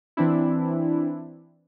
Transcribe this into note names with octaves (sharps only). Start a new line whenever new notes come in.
E3 C4 D4 E4